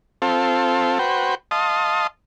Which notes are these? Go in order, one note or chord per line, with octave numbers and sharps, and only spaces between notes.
C4 F4 A4
F#4 B4 C5 G5
D#5 F5 A5 C6 D#6